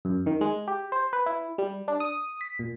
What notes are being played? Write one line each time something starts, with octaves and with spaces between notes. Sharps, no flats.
F#2
D#3
G#3
G4
C5
B4
E4
G3
D4
D#6
B6
A#2